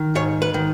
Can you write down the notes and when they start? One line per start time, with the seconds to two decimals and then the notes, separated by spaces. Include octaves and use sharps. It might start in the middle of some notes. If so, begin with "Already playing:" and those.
Already playing: D#3
0.15 G#2 C#5
0.42 B4
0.54 D#3